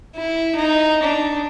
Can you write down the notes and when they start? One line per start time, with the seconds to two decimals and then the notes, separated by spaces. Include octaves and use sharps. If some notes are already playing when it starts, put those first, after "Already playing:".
0.16 E4
0.55 D#4
1.03 D4